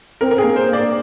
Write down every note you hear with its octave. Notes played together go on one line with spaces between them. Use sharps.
C4 A#4
A#4
C4 G#4
A#3
C5
A#3
D5